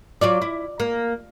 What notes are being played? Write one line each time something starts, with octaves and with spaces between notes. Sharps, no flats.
F#3 F4 D5
E4
A#3